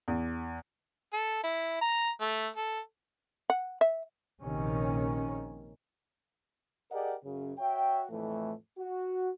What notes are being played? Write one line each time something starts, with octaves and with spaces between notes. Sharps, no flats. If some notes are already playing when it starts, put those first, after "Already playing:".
E2
A4
E4
A#5
A3
A4
F#5
E5
A#1 C3 D#3 C#4
G4 G#4 A#4 D5 D#5 F#5
F#2 C#3
F#4 C#5 E5 G5
F2 A2 E3 A3
F#4